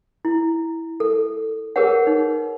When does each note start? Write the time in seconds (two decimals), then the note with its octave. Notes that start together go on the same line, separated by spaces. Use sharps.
0.25 E4
1.00 A4
1.76 G4 G#4 A#4 B4 C#5 F#5
2.07 D#4